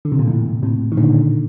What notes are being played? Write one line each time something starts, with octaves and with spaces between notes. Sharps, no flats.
D3
C3
A#2
F2 A2
A2 C3
D#3
A#2 D3